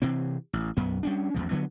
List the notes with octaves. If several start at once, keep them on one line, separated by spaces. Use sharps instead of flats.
C3 E3 C4
A1
B1 F#2 B3
G3 C#4 D4
A1 E2 A2 F3
D3 F#3 B3